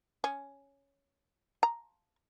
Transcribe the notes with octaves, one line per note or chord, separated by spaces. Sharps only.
C#4
A#5